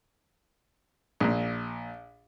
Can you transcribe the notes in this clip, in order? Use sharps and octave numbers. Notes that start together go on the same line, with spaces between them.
A#1 A#2